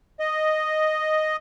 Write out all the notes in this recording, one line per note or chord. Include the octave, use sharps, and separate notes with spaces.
D#5